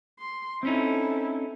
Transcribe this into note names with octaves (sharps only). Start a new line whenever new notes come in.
C6
C4 C#4 D#4 E4 A4